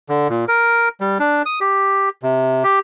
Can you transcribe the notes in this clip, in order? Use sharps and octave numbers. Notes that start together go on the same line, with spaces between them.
D3
A#2
A#4
G3
D4
D#6
G4
C3
G4